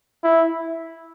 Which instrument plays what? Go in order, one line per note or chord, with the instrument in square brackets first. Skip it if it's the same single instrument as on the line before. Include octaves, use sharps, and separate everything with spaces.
[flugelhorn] E4